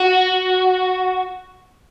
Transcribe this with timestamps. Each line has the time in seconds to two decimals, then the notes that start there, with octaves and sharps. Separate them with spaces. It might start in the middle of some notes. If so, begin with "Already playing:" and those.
Already playing: F#4